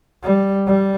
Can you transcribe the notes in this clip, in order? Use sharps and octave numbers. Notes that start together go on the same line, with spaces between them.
G3
G3